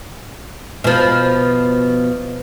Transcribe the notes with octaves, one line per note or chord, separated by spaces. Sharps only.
B2 F3